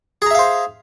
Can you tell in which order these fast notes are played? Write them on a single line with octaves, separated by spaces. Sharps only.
G#4 A#5 E5 F5 C5